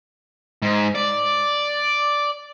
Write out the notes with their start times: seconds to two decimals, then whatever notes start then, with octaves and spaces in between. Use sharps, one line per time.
0.62 G#2
0.95 D5